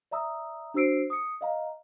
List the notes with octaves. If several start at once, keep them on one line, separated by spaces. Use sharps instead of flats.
D5 E5 A#5 D#6 E6
D4 F#4 C5 E6 C7 D7
D#6 C#7
D#5 F5 A#5